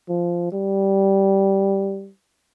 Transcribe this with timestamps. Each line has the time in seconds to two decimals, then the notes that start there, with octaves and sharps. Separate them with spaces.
0.09 F3
0.52 G3